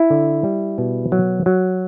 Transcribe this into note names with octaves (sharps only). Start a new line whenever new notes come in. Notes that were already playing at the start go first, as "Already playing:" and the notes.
Already playing: E4
D3
G3
B2
F#3
F#3